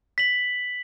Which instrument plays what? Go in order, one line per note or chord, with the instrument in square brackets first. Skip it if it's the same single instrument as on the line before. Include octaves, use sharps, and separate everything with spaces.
[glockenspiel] B6 F#7